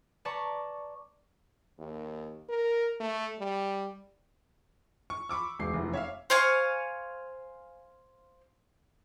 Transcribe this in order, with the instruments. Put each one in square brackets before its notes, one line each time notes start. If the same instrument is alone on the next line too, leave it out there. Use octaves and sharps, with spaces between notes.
[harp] B4 D5 A5 A#5 C#6 D6
[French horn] D#2
A#4
A3
G3
[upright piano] C#6
B5 C#6 D6 E6
E1 C7
F1 E2
C#5 E5 F5
[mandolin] C5 F5 G#5 C#6